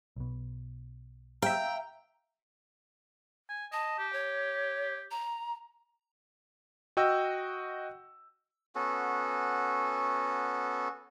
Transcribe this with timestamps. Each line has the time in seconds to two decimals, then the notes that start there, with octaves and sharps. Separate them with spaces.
0.16 B1 B2
1.42 E5 F5 G5 A#5
3.49 G#5
3.73 D#5 A5
3.99 G4
4.13 C#5
5.11 A#5
6.97 F#4 D#5 G5 E6
8.75 B3 C#4 F#4 A4